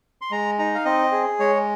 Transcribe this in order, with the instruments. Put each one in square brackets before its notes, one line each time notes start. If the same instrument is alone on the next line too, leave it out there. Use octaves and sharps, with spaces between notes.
[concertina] C6
G#3 A#5
D#4 A#5
F5
C4 D#5
G#4
G#3 C#5